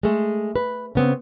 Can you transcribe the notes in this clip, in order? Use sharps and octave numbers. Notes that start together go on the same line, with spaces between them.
G#3 A3
B4
C#3 B3 C4